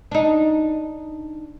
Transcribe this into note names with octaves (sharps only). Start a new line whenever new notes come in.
D4 D#4